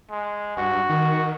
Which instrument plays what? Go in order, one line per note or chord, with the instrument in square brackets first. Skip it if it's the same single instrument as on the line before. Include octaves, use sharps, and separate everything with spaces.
[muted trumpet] G#3
[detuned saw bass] G2 [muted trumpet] F#4
[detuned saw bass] D#3